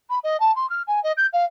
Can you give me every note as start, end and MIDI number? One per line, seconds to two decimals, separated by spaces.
0.09 0.18 83
0.23 0.39 75
0.40 0.54 81
0.55 0.68 84
0.69 0.82 89
0.87 1.02 80
1.03 1.12 75
1.17 1.27 91
1.33 1.44 77